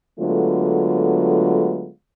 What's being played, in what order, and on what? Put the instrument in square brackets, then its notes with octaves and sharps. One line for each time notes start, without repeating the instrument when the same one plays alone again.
[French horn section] D3 F#3 G#3 A3 B3 F4